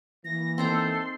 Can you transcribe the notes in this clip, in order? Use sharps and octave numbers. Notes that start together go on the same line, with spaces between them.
E3 A#3 A#6
C4 D#4 A4 A#5 C6